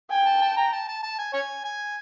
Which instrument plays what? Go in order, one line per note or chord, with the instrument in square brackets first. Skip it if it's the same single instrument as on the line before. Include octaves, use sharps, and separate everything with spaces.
[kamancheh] G5 [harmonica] G#5
[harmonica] A5
A5
A#5
A5
A5
A5
G#5
C#5 G#5
G#5